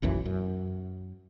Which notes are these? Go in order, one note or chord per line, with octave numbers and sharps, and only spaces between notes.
F1 B1 F#2 E3
F#2